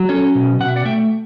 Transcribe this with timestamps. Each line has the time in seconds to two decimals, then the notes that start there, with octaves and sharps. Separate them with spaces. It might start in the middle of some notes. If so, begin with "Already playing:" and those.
Already playing: F#3
0.09 C#4 A4 C#5
0.35 B2
0.60 B2 F#5
0.68 E5
0.76 D5 F#5
0.85 A3 E5 G5